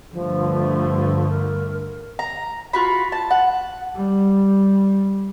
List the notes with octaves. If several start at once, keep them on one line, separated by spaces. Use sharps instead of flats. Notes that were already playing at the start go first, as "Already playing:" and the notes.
G2 D3 F3 A3
A#4
A#5
F4 F#4 B5
A5
F#5
G3